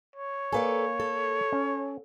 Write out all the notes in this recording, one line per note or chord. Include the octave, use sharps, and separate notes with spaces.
C#5
A#3 A4 B4 D5 G#5
A4
C#4